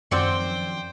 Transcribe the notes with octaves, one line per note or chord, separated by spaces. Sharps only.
F#2 D#3 F3 C4 C5 D5 F#5 G5